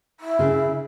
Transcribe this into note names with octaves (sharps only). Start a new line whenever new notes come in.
E4
C#3